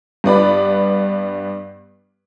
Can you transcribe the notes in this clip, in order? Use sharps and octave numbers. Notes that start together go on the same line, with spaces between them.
G2 B3 D5 B5